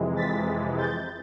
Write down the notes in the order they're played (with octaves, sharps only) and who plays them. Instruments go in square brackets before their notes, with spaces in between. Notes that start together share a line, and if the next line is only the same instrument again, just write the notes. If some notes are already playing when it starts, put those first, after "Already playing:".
Already playing: [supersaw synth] F2 C3 E3 G#3
A6 B6
G6 A6